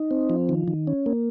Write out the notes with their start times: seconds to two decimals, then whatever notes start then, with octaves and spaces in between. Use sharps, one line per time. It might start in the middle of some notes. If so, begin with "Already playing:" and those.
Already playing: D#4
0.11 C4
0.30 F3
0.49 D#3
0.68 D#3
0.87 C#4
1.06 A#3